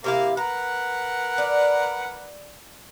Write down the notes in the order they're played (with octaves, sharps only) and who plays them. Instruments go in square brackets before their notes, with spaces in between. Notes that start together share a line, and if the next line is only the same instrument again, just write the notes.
[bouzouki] C3 E4 F5 [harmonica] A#3
[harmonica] A#4 B4 F#5 [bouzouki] A#5
[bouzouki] D5